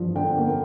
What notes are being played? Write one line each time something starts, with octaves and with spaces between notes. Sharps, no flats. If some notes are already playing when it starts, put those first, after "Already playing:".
Already playing: G2 F3
D3 G5
A#3